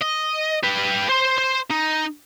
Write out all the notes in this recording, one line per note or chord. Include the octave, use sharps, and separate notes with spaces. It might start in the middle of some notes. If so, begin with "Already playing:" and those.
D#5
G4 B4
C5 C6
C5
D#4